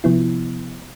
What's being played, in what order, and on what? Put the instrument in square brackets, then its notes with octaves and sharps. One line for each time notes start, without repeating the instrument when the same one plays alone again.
[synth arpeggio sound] C3 F3 B3 E4